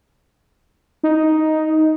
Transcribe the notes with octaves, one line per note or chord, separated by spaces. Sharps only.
D#4